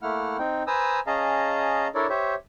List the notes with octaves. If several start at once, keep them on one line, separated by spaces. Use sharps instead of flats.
A3 A#3 E4 F#5 F6
C4 D#4 G5
B4 C5 G#5 A#5 D#6 E6
C#4 G#4 D#5 F5 A5 A#5
D4 E4 A4 A#4 C#5 D5
G4 C5 C#5 E5